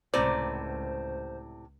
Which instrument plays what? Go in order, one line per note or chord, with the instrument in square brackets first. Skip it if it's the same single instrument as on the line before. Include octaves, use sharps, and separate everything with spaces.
[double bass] C#2 [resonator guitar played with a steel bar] A2 C3 A#5 [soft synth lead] C5 [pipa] D5